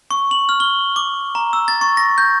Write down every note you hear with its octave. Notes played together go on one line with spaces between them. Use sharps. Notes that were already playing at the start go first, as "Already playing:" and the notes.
C#6
F#7
F6
G7
D6
A#5
E6
A6
C#6
A#6
G6